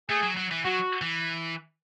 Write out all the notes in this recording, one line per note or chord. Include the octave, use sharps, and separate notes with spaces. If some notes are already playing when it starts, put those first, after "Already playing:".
A3 G#4
F#3
F#3
E3
F#3 F#4
E3